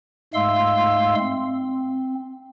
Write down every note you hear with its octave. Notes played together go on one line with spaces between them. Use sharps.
G#2 G#3 A3 F5 C6 E6
C4